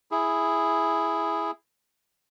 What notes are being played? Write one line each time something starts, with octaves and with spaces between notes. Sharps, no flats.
E4 G#4